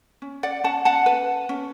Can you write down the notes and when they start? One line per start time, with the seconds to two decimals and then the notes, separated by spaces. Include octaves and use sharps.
0.22 C#4
0.43 D5 F#5
0.64 C#4 F#5 A5
0.85 F#5 A5
1.06 B4
1.49 C#4